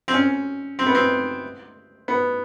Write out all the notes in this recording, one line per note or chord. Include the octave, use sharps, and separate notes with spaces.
C4
C#4
C4
B3
C4
B3